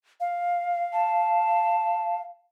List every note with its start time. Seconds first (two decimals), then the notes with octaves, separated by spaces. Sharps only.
0.20 F5
0.93 A5